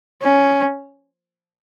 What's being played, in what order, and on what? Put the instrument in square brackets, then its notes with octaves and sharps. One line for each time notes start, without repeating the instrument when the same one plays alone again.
[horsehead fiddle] C#4